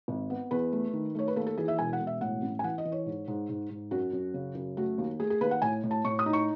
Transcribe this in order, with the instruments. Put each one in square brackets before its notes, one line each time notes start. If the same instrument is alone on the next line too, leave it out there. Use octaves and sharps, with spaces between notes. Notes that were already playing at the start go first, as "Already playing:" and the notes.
[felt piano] G#1
B3
E2 B4
A3
D#3
A3 C#5
B4
D#2 A4
A4
E3 G#4
E5
E1 G#5
F#5
E1
E5
A2 F#5
A1
G#5
E3 F#5
D#5
E3
C#5
G#2
G#2
G#2
G#2
F#2 F#4
F#2
C#3
F#2
A3 F#4
D#2
A3 G#4
G#4
D#2 B4
F#5
A2 G#5
A2
A5
A2 C#6
D#6
D#4
C#6